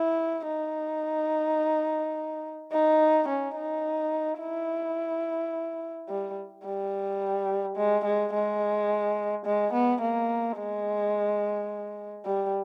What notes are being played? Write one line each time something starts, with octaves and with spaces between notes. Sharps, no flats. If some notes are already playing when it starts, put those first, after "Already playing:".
Already playing: E4
D#4
D#4
C#4
D#4
E4
G3
G3
G#3
G#3
G#3
G#3
B3
A#3
G#3
G3